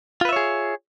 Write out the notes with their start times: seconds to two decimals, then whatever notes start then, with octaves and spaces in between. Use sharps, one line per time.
0.21 F4
0.25 B4
0.29 E5
0.33 C#5
0.36 G#4